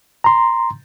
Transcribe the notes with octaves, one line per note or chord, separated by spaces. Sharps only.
A#5 C6